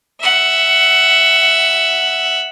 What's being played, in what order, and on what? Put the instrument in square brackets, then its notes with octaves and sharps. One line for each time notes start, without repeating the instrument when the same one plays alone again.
[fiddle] E5 F#5